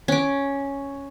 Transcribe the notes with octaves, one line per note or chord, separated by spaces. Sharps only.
C#4 D6